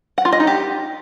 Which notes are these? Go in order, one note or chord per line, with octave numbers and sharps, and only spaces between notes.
F#5
F4
D#5
D#4
G4